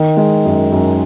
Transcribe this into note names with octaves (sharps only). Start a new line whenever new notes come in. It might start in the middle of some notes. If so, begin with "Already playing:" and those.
Already playing: D#3
G#3
F#2
F#2